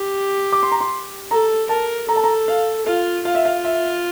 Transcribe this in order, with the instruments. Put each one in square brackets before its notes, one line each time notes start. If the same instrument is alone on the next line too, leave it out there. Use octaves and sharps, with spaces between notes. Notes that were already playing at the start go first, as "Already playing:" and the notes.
Already playing: [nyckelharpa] G4
[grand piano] D6
C6
A#5
C6
[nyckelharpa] A4 [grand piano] A#5
[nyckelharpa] A#4 [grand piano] A5
[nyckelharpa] A4 [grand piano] A#5
[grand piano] A5
A#5
F5
[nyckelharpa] F4 [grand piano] F5
[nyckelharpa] F4 [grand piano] F5
[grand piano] E5
F5
E5